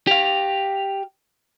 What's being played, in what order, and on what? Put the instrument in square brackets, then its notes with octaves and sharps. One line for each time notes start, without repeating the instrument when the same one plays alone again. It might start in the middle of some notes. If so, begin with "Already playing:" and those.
[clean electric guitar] G4 F5